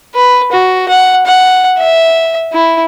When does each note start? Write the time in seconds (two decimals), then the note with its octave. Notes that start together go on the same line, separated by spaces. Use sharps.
0.15 B4
0.52 F#4
0.89 F#5
1.26 F#5
1.78 E5
2.53 E4